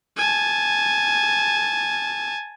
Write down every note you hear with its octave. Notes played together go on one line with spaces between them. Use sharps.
G#5 A5